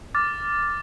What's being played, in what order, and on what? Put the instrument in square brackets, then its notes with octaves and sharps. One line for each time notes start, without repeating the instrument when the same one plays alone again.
[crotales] D6 F6 A6